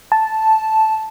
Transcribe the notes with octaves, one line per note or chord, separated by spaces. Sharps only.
A5